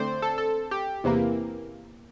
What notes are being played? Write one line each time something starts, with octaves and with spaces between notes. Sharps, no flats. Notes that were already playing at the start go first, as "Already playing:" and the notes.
Already playing: D3 A3 C4 C5 D5
A4
A4
G4
E2 C3 E3 A#3